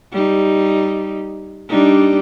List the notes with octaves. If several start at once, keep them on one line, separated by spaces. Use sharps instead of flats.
G3 D#4
G3 D4 D#4